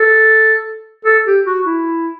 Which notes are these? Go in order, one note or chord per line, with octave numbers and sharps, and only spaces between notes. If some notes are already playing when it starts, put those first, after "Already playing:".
Already playing: A4
A4
G4
F#4
E4